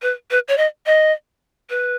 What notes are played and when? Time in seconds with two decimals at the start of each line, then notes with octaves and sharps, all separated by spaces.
0.02 B4
0.31 B4
0.48 C#5
0.58 D#5
0.86 D#5
1.70 B4